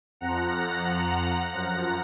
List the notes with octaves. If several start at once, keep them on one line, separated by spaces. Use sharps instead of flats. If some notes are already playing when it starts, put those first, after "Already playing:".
F2 F3 F#5 A#5
F#5 A#5
F#2 F3 F#5 A#5